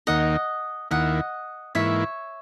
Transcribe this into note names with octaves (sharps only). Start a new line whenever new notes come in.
D#2 D#3 A#3 D#4 D#5 F#5
D#2 D#3 A#3 E4 D#5 F#5
G#2 E3 A#3 E4 C#5 E5